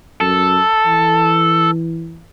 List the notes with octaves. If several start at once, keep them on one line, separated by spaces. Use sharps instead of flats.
F#2 A4
E3